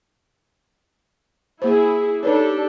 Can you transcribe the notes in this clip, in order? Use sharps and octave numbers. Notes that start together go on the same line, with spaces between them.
A#3 E4 G#4 C5
D4 D#4 G4 A4 B4 C#5